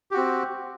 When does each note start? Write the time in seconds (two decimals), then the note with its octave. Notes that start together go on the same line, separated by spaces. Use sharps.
0.11 G4
0.14 F#4
0.17 C4